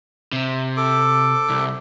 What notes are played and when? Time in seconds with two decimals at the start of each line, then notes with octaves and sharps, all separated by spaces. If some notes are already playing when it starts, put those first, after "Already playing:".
0.32 C3
0.77 A4 D6
1.49 C2